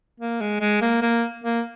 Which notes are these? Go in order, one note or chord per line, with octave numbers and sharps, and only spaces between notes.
A#3
G#3
G#3
A#3
A#3
A#3